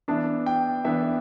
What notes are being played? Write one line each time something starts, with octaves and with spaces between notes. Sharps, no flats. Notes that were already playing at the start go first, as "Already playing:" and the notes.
E3 B3 D4 A5
G5
E3 B3 D4 E5